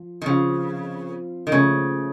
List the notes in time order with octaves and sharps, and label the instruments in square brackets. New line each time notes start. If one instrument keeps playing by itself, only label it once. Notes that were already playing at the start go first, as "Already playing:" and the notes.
Already playing: [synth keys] F3 F4
[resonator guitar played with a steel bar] D#3
[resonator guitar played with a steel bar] C#3 [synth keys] F3 C4 F4
[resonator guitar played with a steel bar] D#3
[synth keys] A#2 F3 A3 C#4 [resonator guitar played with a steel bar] C#3